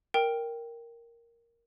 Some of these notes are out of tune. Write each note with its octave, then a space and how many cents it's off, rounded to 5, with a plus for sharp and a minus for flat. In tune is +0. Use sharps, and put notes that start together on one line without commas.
A#4 +0 G5 +0